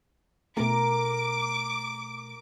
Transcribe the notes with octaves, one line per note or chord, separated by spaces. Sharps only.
B2 A3 A#4 D6